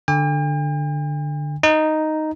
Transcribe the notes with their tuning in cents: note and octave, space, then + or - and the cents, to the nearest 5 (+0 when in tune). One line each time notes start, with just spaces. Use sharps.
D3 +10 G5 +45
D#4 +0 D#5 +0